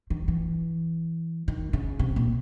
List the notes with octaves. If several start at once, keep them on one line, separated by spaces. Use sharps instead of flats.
D#3
E3
D#3
C#3
C3
A#2